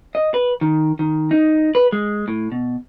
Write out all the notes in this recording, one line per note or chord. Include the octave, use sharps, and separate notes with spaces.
D#5
B4
D#3
D#3
D#4
B4
G#3
A2
B2